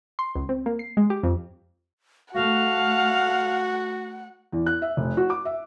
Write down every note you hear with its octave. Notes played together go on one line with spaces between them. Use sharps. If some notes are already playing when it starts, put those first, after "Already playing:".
C6
C#2
C4
A#3
C7
G#3
G4
F2
A3 F#4 F5 F#5
E2
F#6
E5
F1
F#4
D6
E5